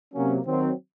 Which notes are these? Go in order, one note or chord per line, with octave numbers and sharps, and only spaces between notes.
C3 F#3 A#3 C#4
D#3 F#3 C4